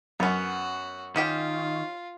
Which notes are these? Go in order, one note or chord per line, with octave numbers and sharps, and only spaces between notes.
F#2 B3 C#4 F#4
D#3 C#4 F4 G4 G5